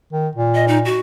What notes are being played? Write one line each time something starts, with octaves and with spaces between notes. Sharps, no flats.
D#3
A#2
D#5
D#4
F#4